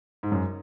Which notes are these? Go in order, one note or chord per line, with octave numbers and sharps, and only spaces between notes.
G#2
F#2